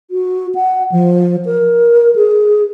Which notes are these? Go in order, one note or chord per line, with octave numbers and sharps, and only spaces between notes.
F#4
F#5
F3
A#4
G#4